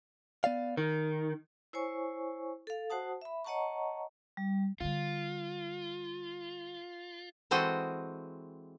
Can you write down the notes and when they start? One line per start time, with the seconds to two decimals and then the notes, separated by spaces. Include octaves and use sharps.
0.44 B3 D5 F5
0.77 D#3 A#4
1.73 E4 C5 C#5 G#5 C#6
2.67 A4 F5
2.90 F#4 C5 F#5 A5 D#6
3.21 E5 B5
3.45 C#5 D#5 F#5 A5 A#5 C#6
4.37 G3
4.80 D3 G3 F4
7.51 E3 G#3 C4 F#4 A4 D#5